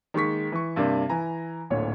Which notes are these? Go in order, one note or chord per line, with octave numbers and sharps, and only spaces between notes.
D#3 G#3 A#3 C#6 B6
E3 C#6
G2 C3 A#3 D4
E3 G#5 A#5
D1 D2 A#2 C#5